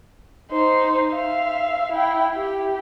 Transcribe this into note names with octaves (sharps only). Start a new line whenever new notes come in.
D#4 C5
E5 F5
E4 G5
G4